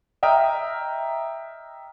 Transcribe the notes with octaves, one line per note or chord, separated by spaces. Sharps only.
D#5 E5 G5 A#5 D#6 F6